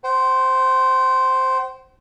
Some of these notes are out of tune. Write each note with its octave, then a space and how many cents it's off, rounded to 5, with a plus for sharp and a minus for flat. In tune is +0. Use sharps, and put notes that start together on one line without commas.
C5 +0 G5 -45